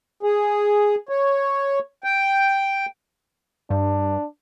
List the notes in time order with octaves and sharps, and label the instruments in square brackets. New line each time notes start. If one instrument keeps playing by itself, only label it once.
[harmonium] G#4
C#5
G5
[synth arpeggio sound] G2 [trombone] D4